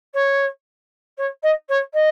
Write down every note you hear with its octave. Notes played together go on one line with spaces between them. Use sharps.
C#5
C#5
D#5
C#5
D#5